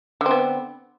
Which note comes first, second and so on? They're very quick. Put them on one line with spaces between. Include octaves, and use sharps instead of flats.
D3 C4 B3